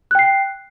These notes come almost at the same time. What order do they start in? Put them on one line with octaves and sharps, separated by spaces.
F#6 G5 C7